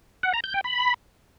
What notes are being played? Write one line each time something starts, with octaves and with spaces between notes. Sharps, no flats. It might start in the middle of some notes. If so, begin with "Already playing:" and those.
F#5
A#5
G6
G5
B5